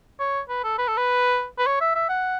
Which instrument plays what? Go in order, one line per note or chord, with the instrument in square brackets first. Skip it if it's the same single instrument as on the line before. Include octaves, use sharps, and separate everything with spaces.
[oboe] C#5
B4
A4
B4
A4
B4
B4
C#5
E5
E5
F#5